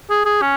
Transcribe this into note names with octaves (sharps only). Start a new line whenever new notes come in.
G#4
G#4
C#4